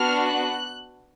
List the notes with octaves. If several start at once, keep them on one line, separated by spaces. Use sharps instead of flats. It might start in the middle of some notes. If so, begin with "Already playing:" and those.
Already playing: B3 D4 F#4 F6
F#6